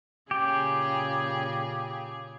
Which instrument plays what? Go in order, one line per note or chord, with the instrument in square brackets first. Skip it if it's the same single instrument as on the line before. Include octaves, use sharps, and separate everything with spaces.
[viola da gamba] A#2 C#3 G#4 [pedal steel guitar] G4